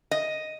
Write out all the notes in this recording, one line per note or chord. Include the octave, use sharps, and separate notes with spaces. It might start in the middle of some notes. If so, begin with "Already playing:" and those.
D#5